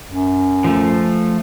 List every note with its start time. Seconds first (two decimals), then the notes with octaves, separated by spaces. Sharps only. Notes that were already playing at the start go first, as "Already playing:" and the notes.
0.09 F#2
0.64 F3 A3